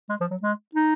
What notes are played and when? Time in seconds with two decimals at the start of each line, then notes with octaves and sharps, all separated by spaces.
0.10 G#3
0.21 F3
0.31 F#3
0.42 G#3
0.75 D#4